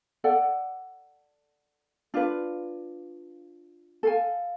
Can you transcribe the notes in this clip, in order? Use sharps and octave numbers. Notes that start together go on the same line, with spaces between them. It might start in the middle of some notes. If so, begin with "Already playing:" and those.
A4 D5 F#5
D4 F4 B4
A4 F5 G#5